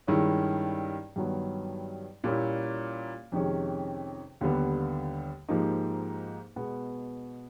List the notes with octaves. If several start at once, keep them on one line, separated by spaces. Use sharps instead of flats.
G2 D#3 G#3 C#4 E4
G2 D#3 F#3 B3
A#2 G3 A#3 C#4 E4
F2 C3 D#3 G#3 C#4
D#2 D3 G3 B3
G#2 F3 A#3 D#4 G4
B2 G#3 B3